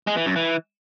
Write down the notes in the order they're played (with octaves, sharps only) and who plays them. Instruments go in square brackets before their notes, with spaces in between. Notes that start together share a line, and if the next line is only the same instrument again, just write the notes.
[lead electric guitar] G#3
E3
F#2
E3